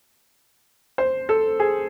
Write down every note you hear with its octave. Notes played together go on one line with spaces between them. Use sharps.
C5
A4
G#4